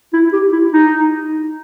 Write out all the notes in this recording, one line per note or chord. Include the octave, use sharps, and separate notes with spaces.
E4
G4
E4
D#4